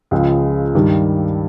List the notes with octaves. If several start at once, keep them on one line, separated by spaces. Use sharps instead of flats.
C#2 C#3 F3 G#3
G2 D#3 G3